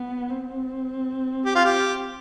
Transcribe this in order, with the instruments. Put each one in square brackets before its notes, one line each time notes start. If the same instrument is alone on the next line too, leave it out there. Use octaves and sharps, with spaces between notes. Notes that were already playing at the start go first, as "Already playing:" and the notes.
Already playing: [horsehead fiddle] B3
C4
[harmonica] G4
F4
G4